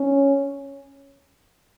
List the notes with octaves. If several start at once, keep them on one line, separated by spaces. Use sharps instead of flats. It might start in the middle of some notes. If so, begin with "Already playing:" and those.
Already playing: C#4